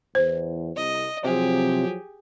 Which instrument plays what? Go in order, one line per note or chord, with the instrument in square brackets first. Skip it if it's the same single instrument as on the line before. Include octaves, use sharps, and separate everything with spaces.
[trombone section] E2 [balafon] C5
[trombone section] C2 [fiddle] D#5
[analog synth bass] C3 [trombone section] F3 F#3 [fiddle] G4 G#4